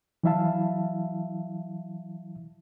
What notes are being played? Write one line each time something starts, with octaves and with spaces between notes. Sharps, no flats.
E3 F#3 E4 E5 F5 A5